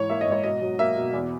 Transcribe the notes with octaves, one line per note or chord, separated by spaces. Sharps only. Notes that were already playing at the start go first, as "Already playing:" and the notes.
Already playing: G#2 E3 C#5
A#3 E5
D#5
G#2
C#5
B2 D#5
F#3
A#3 E5
B2
E2